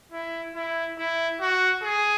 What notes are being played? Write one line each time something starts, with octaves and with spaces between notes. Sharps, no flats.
E4
E4
E4
F#4
G#4